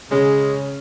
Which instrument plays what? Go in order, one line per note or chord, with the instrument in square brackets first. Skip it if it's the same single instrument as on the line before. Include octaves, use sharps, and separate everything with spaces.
[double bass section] C#3 [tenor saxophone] G#3 [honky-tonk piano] C#4